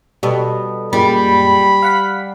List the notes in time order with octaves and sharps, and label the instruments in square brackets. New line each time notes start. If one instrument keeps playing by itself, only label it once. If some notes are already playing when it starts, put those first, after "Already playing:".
[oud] B2 [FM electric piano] G3 A4
[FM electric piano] F#2 A#2 G#3 [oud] G3 [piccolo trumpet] B5
[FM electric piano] F5 F#5 B6